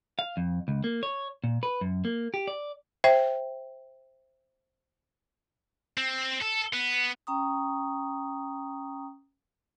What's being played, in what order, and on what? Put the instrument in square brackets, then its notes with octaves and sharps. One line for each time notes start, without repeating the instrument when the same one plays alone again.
[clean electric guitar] F5
F2
C#2
A#3
C#5
A#2
B4
F#2
A#3
G4
D5
[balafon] C5 E5 G5
[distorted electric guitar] C4
A4
B3
[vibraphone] C#4 G5 A#5 C#6 D#6